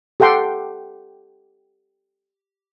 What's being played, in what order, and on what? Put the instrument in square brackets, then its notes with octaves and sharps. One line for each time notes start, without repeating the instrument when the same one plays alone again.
[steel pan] G4 A4 F#5 G5 C6